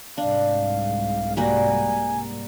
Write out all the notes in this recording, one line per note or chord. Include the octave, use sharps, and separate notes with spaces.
C2 G#2 D4 F5
G3 A#3 F#4 G#5